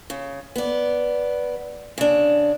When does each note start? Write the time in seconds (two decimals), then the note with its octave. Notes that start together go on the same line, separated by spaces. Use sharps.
0.10 C#3
0.56 B3 D5
1.98 C#3 D4